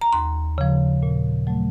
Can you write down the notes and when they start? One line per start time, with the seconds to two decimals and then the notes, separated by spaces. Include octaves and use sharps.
0.01 A#5
0.13 D#2 C6
0.58 C#3 F3
1.03 A#2
1.47 F#3 A3